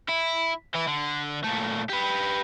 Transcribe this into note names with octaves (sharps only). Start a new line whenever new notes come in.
E4
E3 E4
D3
A#2 A3
G4 B4